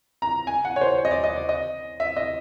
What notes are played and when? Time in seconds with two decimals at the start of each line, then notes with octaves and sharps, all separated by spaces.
0.22 A#5
0.47 G#5
0.65 F#5
0.76 C#5
0.81 C5
0.98 C#5
1.05 D#5
1.11 D5
1.24 D#5
1.36 D5
1.49 D#5
2.00 E5
2.17 D#5